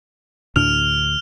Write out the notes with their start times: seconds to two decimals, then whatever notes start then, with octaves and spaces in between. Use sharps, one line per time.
0.56 D2 A2 D4 F6 F7